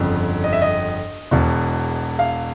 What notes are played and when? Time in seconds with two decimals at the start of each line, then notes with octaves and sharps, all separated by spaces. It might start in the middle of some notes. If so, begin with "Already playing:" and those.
Already playing: G1 F2 C#3
0.44 D#5
0.53 E5
0.62 D#5
1.31 E1 E2 B2
2.19 F5